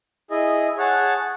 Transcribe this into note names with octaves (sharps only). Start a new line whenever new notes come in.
E4 G#4 D#5
G#4 C#5 F#5 A5